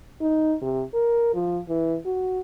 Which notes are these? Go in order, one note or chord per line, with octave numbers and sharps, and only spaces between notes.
D#4
C3
A#4
F3
E3
F#4